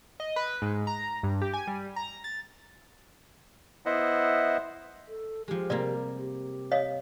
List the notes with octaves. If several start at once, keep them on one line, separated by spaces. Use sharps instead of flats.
D#5
B4
G#2
A#5
G2
G4
G#5
G3
A#5
A6
B3 E4 C5 D#5 E5 F#5
A4
F3 G#3 G4
C3 G3 A#3 D5
G4
C#5 D#5 F5